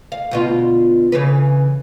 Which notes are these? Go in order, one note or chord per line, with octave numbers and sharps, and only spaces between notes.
F5
D2 B2 F4
C#3 E3 B4